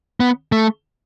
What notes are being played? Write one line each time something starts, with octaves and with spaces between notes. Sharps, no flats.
B3
A3